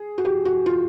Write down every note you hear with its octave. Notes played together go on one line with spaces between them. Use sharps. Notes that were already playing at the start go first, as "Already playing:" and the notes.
Already playing: G#4
F#4
G4
F#4
F4